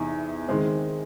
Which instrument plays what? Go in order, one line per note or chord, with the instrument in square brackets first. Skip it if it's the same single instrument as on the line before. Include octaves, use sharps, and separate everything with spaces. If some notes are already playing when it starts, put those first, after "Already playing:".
Already playing: [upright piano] E2 C3 E3 D#4
D#3 G#3 C4